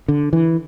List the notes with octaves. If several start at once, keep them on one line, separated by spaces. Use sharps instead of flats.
D3
E3